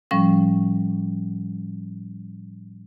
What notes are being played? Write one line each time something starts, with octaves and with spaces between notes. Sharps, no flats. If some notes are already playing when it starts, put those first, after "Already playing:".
A2 F3 G3 C#4 C#6